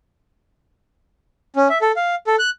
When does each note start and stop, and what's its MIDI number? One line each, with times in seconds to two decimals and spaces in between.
1.56 1.68 61
1.70 1.78 76
1.82 1.92 69
1.96 2.15 77
2.27 2.36 69
2.39 2.50 90